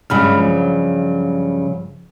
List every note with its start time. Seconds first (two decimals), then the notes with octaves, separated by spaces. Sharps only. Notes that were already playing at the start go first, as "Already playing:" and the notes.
0.10 G2 C#3 F#3 G#3 B5 F6
0.37 F3